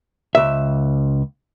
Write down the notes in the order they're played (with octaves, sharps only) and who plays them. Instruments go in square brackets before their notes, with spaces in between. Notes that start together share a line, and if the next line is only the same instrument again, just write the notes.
[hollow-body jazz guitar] C#2 E5